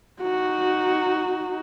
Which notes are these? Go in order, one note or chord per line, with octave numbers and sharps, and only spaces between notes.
D#4 F#4